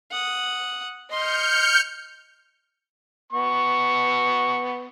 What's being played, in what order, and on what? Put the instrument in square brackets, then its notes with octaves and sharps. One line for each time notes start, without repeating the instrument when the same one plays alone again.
[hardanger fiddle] F#5 D#6
[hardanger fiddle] D#5 C6 [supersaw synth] F6 G6 C#7
[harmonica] B3 C#6